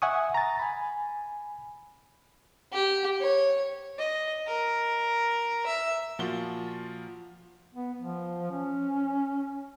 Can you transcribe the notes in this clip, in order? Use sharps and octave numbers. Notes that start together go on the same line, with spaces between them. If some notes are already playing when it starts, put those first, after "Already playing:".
E5 F#5 G#5 C#6 D#6
A#5 A6
G#5 B5
G4
C#5
D#5
A#4
E5
A#2 F3 F4 F#4 G7
B3
F3
C#4